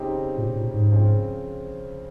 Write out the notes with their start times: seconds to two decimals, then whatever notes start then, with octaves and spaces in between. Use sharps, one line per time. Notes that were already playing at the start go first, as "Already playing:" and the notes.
Already playing: C#3 G3 C4 D#4 G4
0.37 A#2
0.55 A#2
0.73 G#2
0.92 C#3 F3 C4 F4